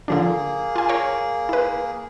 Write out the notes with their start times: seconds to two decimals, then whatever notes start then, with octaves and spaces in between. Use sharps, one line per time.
0.08 D3 F3 A#3 D4 G#4
0.76 F4 G#5
0.89 A#4 C#5 G5
1.49 E4 B4